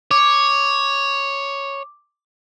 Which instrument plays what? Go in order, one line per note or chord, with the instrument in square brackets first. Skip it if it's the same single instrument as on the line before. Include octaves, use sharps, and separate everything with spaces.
[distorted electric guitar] C#5 [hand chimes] D6